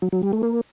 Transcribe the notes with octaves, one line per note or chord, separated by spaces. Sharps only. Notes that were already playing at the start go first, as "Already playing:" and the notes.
F#3
F#3
G3
A3
A#3